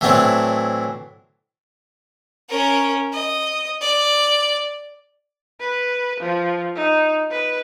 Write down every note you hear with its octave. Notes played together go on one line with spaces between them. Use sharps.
A2 E3 F#3 C4 D4
C#4 A#4
D#5
D5
B4
F3
D#4
B4